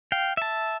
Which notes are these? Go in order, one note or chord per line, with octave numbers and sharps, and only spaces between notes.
F5 G5
E5 A5